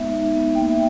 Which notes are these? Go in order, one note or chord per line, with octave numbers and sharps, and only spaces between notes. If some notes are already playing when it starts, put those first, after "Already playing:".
Already playing: G#3 B3 D#4 E5
D#4
B3
A#3 G5
E5